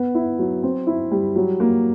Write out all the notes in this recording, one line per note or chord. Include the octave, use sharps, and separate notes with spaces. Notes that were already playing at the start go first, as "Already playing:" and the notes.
Already playing: B3
E4
F#3
C4
E4
G3
F#3
A#3